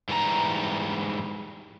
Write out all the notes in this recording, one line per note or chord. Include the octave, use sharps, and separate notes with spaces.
G#2 E3 G3 A5 A#5